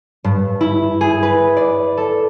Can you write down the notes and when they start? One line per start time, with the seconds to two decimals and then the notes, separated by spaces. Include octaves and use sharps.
0.24 G2
0.61 E4
1.01 G#4
1.23 B4
1.57 D5
1.97 A4